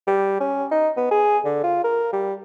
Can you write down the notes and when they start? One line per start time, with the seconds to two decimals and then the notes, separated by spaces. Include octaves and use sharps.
0.07 G3
0.40 C#4
0.71 D#4
0.97 B3
1.11 G#4
1.45 D3
1.64 F4
1.84 A#4
2.13 G3